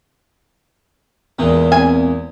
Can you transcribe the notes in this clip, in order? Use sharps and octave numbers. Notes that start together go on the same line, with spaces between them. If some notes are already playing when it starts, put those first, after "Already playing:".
E2 A#2 E3 G#3
C4 G#5